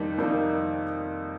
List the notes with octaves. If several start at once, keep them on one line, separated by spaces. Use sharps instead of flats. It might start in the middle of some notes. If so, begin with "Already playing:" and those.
Already playing: F2 D#3 G3 A#3 D#4
F2 D#3 G3 A#3 D#4